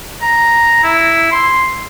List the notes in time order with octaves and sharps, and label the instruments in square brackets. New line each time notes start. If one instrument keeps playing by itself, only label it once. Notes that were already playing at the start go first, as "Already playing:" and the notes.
[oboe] A#5
E4
C6